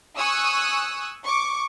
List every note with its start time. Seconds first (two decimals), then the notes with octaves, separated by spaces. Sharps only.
0.18 G#5 C#6 D#6 E6 F#6
1.24 C#6 D6